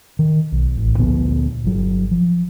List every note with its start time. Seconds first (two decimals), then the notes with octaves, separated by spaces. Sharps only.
0.19 D#3
0.52 B1
0.77 A1
0.98 D2 A#2 F3 B3
1.64 G1 F#3
2.11 F3